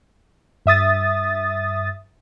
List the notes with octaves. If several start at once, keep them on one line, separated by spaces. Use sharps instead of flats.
G2 E5 D#6 A6